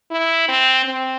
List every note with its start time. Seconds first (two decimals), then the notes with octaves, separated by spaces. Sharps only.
0.11 E4
0.48 C4
0.85 C4